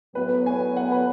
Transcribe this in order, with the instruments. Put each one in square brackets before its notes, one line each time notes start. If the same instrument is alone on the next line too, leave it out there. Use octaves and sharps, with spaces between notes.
[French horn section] A2 F#3 B3 [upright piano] B4
[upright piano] G#5
F#5
B4